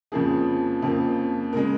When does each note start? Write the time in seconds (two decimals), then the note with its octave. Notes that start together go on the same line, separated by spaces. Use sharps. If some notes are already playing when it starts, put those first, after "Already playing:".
0.12 F2 C#3 F3 A#3 G#4
0.82 F2 C#3 F3 A#3
1.53 C#3 G#3 A#4